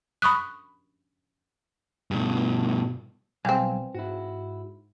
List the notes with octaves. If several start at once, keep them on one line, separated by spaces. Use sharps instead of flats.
B5 C#6 D#6 F#6
G2 B2
B1 E3 G3 C4 F5 G5 G#5
G#2 E4 F#4